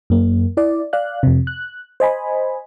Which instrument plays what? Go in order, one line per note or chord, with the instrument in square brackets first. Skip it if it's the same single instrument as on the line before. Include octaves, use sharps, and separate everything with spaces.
[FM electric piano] F#2 A#3
E4 D5
D5 F5 F#6
F2 C3
F#6
C5 D#5 G#5 B5